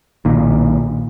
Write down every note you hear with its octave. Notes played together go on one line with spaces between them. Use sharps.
B1 A#2 D#3